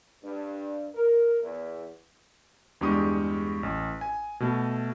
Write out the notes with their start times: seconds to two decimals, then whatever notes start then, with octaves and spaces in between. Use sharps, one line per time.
0.22 G2
0.94 A#4
1.41 E2
2.81 E2 G2 G#3 G4 C#6 D#6
3.63 A1
4.01 G#5
4.40 B2 A3